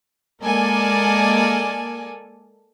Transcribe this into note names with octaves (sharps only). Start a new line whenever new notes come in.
G#3 A#3 A4 A#4 D5 G#5